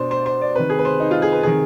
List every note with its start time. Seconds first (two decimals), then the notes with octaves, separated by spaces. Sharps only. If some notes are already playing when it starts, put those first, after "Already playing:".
Already playing: B2 D4 C5
0.11 C5
0.26 C5
0.41 D5
0.55 C3 D#3 B4
0.70 G#4
0.79 B4
0.85 C5
1.00 D#4
1.11 F4
1.22 G#4
1.33 B4
1.43 C3 D#3 G#4